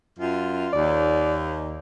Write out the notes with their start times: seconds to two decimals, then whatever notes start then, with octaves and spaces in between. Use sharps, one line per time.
0.17 F#2 F4
0.73 D#2 D5